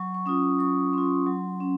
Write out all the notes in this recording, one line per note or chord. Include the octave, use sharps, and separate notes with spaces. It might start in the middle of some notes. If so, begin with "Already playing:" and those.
Already playing: F#3 C#6
C#6
C#4 F4 D#6
F#3 C#6
C#4 F4 C6
F#3
C#4